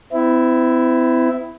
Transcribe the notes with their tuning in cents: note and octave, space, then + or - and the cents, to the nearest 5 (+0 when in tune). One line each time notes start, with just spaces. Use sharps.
C4 -40 E4 +0